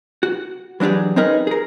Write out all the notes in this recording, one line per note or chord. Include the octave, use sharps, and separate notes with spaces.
F#4
E3 F#3 D4 G4 G#4
C4 C#4 D#4 G#4 A#4 B4
G#4 A#4